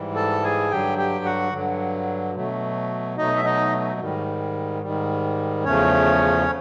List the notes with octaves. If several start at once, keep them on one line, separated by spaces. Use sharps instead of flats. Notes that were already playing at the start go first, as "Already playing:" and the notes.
Already playing: G#2 E3 G3
A4 A5
G#4 G#5
G2 D3 F#3 G4 G5
G4 G5
F#4 F#5
G2 D3 F#3
B2 F#3 A3
B2 F#3 A3 D#4 D#5
E5
D#4 D#5
G#2 D#3 G3
G#2 D#3 G3
E2 C#3 F3 A3 C#4 C#5